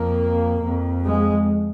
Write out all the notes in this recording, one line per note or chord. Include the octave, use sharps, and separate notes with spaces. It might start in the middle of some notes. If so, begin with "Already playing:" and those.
Already playing: F2 A#3
F2
G#3